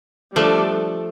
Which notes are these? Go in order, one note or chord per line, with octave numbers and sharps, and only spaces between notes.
F3 G3 A3 D4 A4 D5